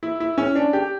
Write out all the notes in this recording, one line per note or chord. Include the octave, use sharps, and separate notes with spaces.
E4
E4
C#4
D4
G4